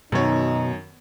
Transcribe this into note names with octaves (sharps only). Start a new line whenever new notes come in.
F#2 B2 D#3 D#4 C#5